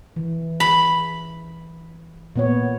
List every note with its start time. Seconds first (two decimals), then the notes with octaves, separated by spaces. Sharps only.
0.16 E3
0.60 B5
2.36 A#2 B3 C#5